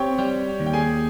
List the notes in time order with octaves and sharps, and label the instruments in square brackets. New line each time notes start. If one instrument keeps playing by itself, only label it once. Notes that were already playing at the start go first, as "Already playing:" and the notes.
Already playing: [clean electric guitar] C4 [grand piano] G4 C#5 G5 C#6
[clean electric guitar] G3 [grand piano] G4 G5
[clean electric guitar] D#2
[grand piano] G5
G#4 G#5